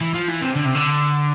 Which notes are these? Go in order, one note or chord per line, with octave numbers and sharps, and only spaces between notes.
E3
F3
E3
C3
D3
C3
D3